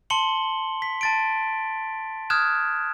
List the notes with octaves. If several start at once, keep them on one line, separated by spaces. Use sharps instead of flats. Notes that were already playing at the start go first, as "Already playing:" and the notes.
A5 C6 C#7 F#7 G7
B6
A5 A6 D7
D#6 F6 F#6 G#6 E7